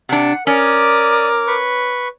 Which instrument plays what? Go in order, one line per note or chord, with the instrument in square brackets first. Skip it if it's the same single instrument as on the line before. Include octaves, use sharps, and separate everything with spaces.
[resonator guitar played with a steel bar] C3 D4 [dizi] F#5
[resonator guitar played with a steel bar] C#4 [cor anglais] A#4 [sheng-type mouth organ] D5 D#6 [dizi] D6
[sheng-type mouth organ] B4 C#6